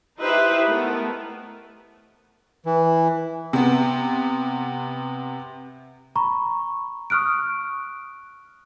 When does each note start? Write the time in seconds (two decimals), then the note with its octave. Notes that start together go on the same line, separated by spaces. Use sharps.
0.19 D#4 E4 G4 B4 C5 E5
0.67 A3 B3 A#4
2.66 E3
3.53 C3 B3
6.16 A#5 B5 C#6
7.10 C#6 D#6 F6 F#6 D7